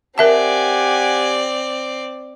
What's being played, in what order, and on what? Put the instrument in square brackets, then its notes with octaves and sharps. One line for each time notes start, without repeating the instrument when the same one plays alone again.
[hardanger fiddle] C4 D5 [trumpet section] G4 F#5 G#5 [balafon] A#4 E5 A5